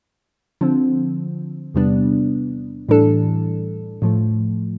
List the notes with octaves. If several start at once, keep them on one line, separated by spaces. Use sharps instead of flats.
D3 F3 C4
E2 C3 G3 B3 D4
A2 E3 G3 D4 A4
A2 F3 A3